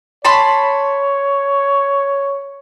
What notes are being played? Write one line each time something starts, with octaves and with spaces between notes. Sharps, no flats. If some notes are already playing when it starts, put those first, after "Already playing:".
C#5 A5 B5 C6